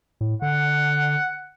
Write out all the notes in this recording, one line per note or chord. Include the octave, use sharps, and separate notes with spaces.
A2
D3 F#5